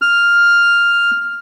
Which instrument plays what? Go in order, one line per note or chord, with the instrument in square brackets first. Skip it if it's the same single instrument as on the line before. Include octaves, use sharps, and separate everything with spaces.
[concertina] F6